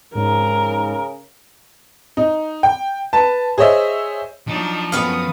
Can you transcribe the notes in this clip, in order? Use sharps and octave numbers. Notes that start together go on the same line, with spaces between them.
G#2 C#3 A#4
D#4
G5
B4 A5
G#4 C5 C#5 D#5 E5
F3 F#3 D4 D#4
F#2 B3 F5 D#6